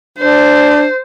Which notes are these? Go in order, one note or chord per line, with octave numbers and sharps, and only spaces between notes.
D4 C5